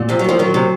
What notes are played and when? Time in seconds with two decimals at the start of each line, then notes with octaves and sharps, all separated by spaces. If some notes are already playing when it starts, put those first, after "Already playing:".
Already playing: A#2
0.09 C3 F3
0.19 F#3
0.24 D#3 F3
0.39 D#3 F#3
0.54 C3